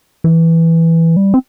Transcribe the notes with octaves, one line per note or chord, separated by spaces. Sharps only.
E3
G3
C4